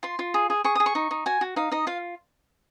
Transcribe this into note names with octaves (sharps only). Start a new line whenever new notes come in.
F4 C6
F4
G#4
G#4
G#4 C#6
G#4 D#6
C#6
D#4
D#4
F#4 G#5
F#4
D#4 F5
D#4 D#5
F4 F5